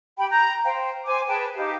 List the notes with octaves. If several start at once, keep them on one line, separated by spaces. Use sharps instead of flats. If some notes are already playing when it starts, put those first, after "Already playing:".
G4 G5 B5
A#5 G6
C5 F5 G5
C5 G#5 D6
G#4 B4 G5 A5
D#4 G4 F5